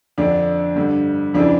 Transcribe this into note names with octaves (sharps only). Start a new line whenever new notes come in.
F2 D3 D4
G2 D3
F2 C#3 E3 D4